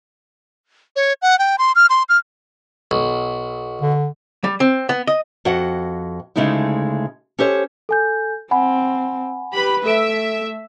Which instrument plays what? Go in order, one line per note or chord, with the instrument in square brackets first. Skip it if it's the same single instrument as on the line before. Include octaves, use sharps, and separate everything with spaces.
[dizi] C#5
F#5
G5
C6
F6
C6
F6
[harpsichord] B1
[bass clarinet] D3
[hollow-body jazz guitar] G3
C4
B3
D#5
[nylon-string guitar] F2 F#4 D#5 F#5
D2 C#3 G#3 A3 D#4 E4
C#4 G4 A4 C5 C#5
[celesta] A4 G#5 G6
[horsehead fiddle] C4 [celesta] F#5 G#5 B5
[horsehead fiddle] G4 B4 [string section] B5
[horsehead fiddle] A3 [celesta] A4 D7 [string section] E5